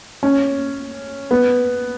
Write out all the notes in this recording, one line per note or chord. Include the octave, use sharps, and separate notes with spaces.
C#4
B3